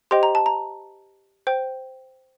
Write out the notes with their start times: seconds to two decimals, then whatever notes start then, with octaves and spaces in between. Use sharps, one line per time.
0.11 G4 C5 D#5 G5 C6
0.23 A#5
0.35 A5
0.46 A#5
1.47 C5 G5